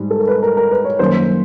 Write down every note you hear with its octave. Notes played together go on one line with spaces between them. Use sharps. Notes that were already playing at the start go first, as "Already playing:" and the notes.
Already playing: G#2 G3
A4
A#4
B4
A#4
A#4
B4
C#5
F#2 D#3 G3 A#3 C#4 C5